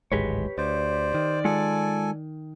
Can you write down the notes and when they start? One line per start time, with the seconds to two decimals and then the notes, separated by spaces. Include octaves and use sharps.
0.12 D1 G#1 G#3 G4 B4 C#5
0.58 D2 C5 D5
1.14 D#3
1.45 G#3 F4 A4 F#5 G#5